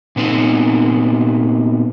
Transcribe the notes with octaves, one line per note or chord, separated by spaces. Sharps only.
A#2 B3 C4 D#4